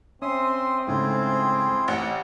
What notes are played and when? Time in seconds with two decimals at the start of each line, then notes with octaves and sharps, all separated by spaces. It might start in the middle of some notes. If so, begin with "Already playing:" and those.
0.22 C4 C#4 E5 C6 D#6
0.88 G#2 C#3 A3 E4 F4 G#4
1.88 A1 C#5 F#5